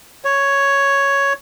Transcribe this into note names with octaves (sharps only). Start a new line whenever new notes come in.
C#5